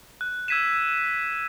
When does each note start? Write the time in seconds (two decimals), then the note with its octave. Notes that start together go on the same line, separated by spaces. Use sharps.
0.21 F#6
0.48 E6 G#6 B6 D#7 E7